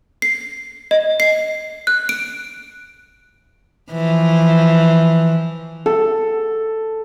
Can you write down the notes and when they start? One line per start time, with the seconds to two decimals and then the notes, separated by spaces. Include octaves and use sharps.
0.22 C7
0.91 D#5
1.20 C7
1.87 F#6
2.09 D7
3.92 E3 F3
5.86 A4